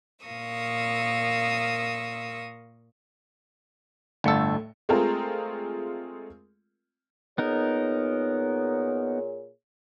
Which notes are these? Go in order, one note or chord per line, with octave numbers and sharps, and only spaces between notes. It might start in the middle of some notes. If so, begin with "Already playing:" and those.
A#2 A#4 F5 C#6 D#6 E6
G1 A2 A3 A4 C#7
G#3 A3 C4 F4 G#4 A#4
A#2 B3 D#4 G#4 A#4 C#5